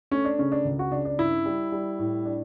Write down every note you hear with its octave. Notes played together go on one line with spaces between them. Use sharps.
A3 C#4
D4
C#3 C#4
D4
C#2
F#4
C#3 D4
D4
G2 E4
G3
G3
A2
D4